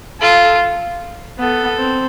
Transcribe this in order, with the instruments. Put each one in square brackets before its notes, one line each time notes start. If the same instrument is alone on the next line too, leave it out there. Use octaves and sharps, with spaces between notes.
[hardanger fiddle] F4 [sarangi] A4
[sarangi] B3 [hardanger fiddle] A4
[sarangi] C4